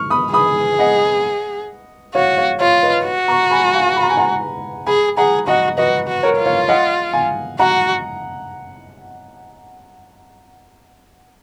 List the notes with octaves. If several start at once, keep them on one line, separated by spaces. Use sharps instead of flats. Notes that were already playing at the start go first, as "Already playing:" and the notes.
Already playing: C#6 F6
B5 D#6
G#4 B5 D#6
D#5 F#5
F#4 C#5 F5
C#5 F5
F4 C#5 F5
B4 D#5
F#4
A#5 C#6
G#5 B5
F5 G#5
B5
A#5
G#5
F#5 A#5
G#4 G#5 B5
G#4 F#5 A#5
F#4 D#5 F#5
F#4 B4 D#5
F#4
A#4 C#5
F4
C#5 F5
D#5 F#5
F5 G#5
F#4 F#5 A#5